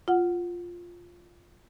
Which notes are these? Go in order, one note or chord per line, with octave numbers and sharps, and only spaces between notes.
F4 F#5